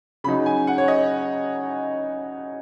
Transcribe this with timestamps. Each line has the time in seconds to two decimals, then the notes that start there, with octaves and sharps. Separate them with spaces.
0.24 C#3 B5
0.27 F#3 D#4
0.46 G#5
0.67 F#5
0.78 C#5
0.88 D#5